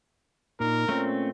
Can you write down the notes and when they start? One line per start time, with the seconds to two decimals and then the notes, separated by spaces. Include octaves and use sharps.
0.60 A#2 D#4 A#4
0.89 A#2 A3 C4 C#4